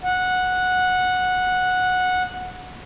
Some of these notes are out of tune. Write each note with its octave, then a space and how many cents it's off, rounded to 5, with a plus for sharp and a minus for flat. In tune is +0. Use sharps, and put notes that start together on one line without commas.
F#5 -10